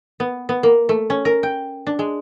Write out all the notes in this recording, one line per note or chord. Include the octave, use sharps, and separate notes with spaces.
B3
B3
A#3
A3
C#4
A#4
G5
D4
G#3